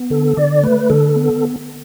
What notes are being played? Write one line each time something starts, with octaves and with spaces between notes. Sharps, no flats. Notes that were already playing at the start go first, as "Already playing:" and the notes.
Already playing: B3
D3 A4
D3 D5
A3 B4
D3 A4
B3